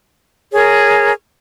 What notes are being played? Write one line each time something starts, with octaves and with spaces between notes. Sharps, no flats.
G#4 A#4 C#5